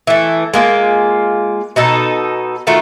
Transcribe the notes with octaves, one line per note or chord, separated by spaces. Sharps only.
E3 A3
G#3 A#3 F4
B2 D#4 A4
D#3 A3 F4 F#4